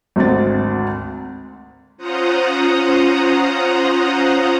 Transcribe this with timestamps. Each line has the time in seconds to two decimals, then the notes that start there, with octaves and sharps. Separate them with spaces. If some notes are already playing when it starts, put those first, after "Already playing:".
0.16 G#1 D2 C4 A6
1.97 C#4 F4 C5 F#5 A#5 D#6